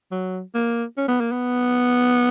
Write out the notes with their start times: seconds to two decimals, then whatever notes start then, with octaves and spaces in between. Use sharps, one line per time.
0.11 F#3
0.54 A#3
0.97 C#4
1.08 B3
1.20 A#3
1.32 B3